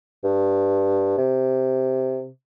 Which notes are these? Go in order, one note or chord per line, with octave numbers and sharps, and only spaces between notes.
G2
C3